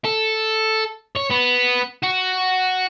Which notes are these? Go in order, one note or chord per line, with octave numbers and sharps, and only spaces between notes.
A4
C#5
B3
F#4